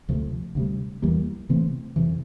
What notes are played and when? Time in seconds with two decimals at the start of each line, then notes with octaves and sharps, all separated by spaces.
0.09 D2 C3 F3 A3
0.55 D2 C3 G3
1.02 E2 E3 G3 A#3
1.49 C3 E3 A3 C4
1.96 F2 C3 E3